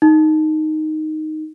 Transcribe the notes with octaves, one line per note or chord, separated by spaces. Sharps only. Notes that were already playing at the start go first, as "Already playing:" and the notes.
D#4